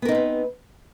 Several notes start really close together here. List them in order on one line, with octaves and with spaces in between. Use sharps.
B3 A#4 D#4 C4 B4